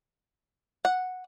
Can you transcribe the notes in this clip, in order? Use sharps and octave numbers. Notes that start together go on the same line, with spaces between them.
F#5